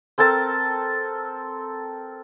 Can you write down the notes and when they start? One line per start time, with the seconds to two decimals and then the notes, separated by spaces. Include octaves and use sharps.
0.18 C4 A4 A#4 A5